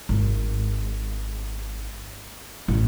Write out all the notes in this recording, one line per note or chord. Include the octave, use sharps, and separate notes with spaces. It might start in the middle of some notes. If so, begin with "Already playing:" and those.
G#1
A1